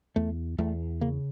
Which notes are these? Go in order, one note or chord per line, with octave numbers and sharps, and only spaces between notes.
E2 A3
E2 A3
C#3 A#3